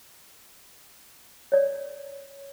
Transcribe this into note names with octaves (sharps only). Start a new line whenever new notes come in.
C#5 D5